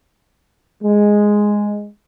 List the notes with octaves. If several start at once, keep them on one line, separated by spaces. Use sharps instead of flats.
G#3